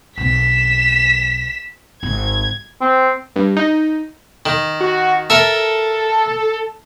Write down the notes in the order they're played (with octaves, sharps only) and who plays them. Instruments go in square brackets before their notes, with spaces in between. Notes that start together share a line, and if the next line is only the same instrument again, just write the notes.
[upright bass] B1 C4 [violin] B6 E7
[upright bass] G#1 [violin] G#6
[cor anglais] C4
[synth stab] G2
D#4
[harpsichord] D#3
[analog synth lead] F#4
[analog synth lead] A4 [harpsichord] A#4 E5